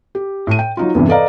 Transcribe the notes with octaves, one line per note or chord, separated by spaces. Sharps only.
G4
A2 D#7
G5
F#3 D#4 F4
E2 G2 C3 E3
A4 B4 D5 D#5 F5 A#5